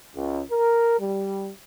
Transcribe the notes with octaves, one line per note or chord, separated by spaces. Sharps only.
C#2
A#4
G3